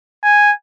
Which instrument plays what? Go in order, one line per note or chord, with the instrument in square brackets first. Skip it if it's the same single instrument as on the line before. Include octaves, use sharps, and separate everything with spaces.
[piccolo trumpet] G#5